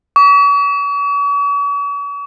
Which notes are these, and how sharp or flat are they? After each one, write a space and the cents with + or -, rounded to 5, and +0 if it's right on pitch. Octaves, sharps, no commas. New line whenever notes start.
C#6 +45